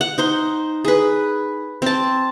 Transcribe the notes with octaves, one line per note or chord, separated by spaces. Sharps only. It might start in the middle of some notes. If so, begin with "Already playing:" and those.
F#5
D#4 C5 C6
G#4 B4
C4 A5